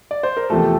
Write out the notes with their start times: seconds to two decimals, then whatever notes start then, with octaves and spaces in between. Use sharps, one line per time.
0.11 D5
0.23 C5
0.37 A#4
0.50 E2 C3 F3 A3 A4